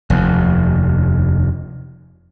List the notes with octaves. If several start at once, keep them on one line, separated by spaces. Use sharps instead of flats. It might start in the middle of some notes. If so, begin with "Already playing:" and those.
F1 D#2